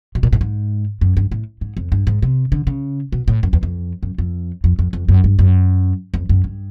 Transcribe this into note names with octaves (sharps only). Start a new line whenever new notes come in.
B2
A#2
A2
G#2
F#2
G2
A2
G#2
F2
G2
G#2
C3
D3
C#3
B2
A2
F#2
E2
F2
F#2
F2
F2
F2
F2
F#2
G2
F#2
F2
F#2
G2